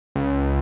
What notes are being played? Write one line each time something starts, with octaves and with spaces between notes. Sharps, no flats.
C#2